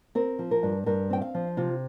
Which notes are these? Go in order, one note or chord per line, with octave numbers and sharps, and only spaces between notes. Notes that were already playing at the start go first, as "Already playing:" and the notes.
C4 A#4
F3
A#4
G2
G2 A#4
C4 G5
F5
F3
C3 F4